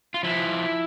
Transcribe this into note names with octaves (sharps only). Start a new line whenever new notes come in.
F4
F3 E4